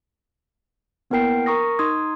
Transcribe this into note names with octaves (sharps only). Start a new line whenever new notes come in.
A#3 B3 E4 A#4 G5 C7
A#4 A#5 C#6 D#6 A#6
D#4 C6 D#6 G#6